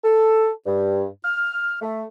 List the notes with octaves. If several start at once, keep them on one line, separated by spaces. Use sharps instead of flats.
A4
G2
F6
A3